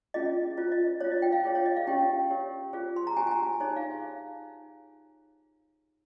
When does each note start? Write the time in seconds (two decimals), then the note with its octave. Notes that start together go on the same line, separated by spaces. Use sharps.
0.14 C#4 F4 G#4 D#5
0.57 F4 C5
0.72 D#5
1.01 F4 C5 C#5
1.12 D#5
1.22 G5
1.32 F5
1.43 F4 G#4 C#5
1.55 C#5
1.66 D#5
1.76 F5
1.87 C#4 G4 C#5 G5
2.30 G4 A#4 C#5
2.73 F4 G#4 C5
2.96 C6
3.07 A#5
3.17 G4 C5 G#5
3.27 G#5
3.31 A#5
3.46 G#5
3.60 D#4 G#4 C5 C#5
3.76 F5